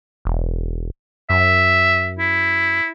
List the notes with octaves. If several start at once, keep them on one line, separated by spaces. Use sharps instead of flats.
E1
F#2 E5
E4